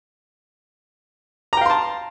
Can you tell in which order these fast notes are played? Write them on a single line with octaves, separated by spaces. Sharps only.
A#5 G5 F5 C6 A5